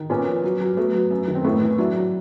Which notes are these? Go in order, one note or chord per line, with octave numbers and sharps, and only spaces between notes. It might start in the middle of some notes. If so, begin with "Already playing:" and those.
Already playing: D#3
A#2 B3 C#4
F3
F#3
F#3
F#3 A3 B3
F#3
F#2
D#3
C4
A2 A3 B3
E3
F#3 D4 E4
F#3